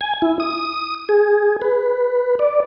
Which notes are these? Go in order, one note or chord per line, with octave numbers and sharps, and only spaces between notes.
G#5
E4
D#6
G#4
B4
D5